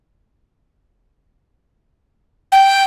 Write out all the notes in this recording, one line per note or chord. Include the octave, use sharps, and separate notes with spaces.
G5